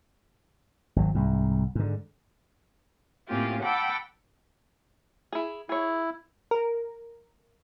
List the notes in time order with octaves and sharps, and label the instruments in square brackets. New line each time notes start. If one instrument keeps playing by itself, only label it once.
[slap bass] G#1 F#3
C2 G#2
G#2 D3
[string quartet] A2 A#3 C4 C#4 F4 G4
F#5 G5 A5 B5 D6 E6
[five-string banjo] E4 G#4
[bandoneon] E4 [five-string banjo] G#4 C#5
[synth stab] A#4